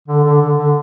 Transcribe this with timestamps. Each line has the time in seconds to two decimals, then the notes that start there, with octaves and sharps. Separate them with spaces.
0.08 D3
0.24 D3
0.41 D3
0.58 D3